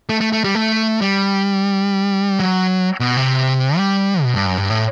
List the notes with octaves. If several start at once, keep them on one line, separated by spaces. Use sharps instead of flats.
A3
A3
A3
G3
A3
G3
F#3
B2
C3
G3
B2
G2
F#2
G2
A2